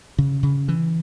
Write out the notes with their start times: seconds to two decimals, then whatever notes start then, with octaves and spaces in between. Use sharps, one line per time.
0.19 C#3
0.43 C#3
0.68 E3